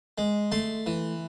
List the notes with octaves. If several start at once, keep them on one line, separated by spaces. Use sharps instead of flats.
G#3
A3 C6
E3